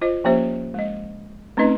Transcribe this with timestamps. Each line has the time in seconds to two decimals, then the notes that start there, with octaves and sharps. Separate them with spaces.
0.02 F4 C5 D#5
0.24 F3 A#3 C#4 G4 C5 E5
0.74 G#3 D#5
1.57 A3 C4 C#4 D#4 B4 D#5